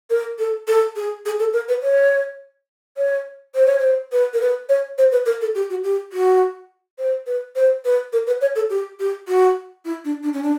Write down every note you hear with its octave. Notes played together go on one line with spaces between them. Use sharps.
A#4
A4
A4
G#4
G#4
A4
A#4
B4
C#5
C#5
C5
C#5
C5
B4
A#4
B4
C#5
C5
B4
A#4
A4
G4
F#4
G4
F#4
C5
B4
C5
B4
A#4
B4
C#5
A4
G4
G4
F#4
E4
D4
D4
C#4
D4